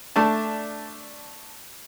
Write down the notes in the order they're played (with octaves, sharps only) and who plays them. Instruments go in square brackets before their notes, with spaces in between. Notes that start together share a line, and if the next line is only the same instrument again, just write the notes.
[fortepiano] A3 D4 A5